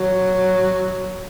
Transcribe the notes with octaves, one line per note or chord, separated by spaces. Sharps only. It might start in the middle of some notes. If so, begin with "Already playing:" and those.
Already playing: F#3